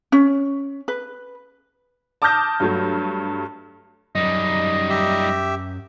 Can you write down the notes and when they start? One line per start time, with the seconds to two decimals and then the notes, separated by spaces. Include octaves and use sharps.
0.12 C#4
0.88 B4
2.22 A5 D6 D#6 F6 G6 A#6
2.60 G2 F#3 A3
4.15 F#2 G3 D#4 D#5
4.90 G4 E5